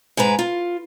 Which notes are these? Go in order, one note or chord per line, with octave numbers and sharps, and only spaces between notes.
G#2 G#3 B4 A#5
F4